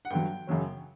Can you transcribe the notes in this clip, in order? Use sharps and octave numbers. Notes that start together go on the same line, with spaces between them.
F#5
G2 D3 F#3 G5
F#2 C#3 F#3 C#4